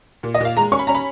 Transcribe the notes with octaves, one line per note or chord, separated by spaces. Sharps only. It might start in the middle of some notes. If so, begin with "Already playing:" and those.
A#2
D#5
A#2 F5
G#3 A#5
C#4 C#6
B5
C#4 A#5
B5